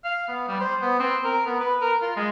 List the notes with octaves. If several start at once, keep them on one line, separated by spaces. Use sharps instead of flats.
F5
B3
G3
C5
B3
C4
A#4
B3
B4
A#4
F4
G#3